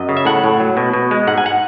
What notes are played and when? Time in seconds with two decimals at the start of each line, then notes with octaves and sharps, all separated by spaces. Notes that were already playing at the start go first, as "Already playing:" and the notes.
Already playing: F#2 D#5
0.09 C#3
0.17 E5
0.25 A2 F#5
0.43 A2
0.60 F#3
0.77 B2
0.93 B2
1.11 G#3
1.27 G#2 F#5
1.38 G#5
1.46 F#5